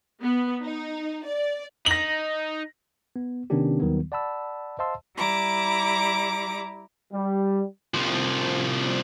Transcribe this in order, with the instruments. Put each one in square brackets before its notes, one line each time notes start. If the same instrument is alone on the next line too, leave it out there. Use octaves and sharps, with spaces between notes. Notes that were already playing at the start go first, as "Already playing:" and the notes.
[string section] B3
D#4
D5
[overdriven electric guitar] D#4 [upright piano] A#6 F#7
[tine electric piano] B3
C3 D#3 B3 C#4 D4 G4
D#2 D#3 F#3 G3 B3
D5 F#5 A5 B5 E6
C5 D#5 F5 A5 C6 E6
[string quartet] G3 E4 A#5 D6
[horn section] G3
[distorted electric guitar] C2 F3